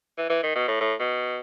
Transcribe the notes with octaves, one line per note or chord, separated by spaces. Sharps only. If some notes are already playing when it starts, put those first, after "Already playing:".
E3
E3
D#3
B2
A2
A2
B2